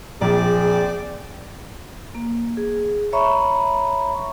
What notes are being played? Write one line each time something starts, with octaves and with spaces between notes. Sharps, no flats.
A#1 C4 G#4 D5
A#3
G#4
C#5 E5 A#5 B5 C#6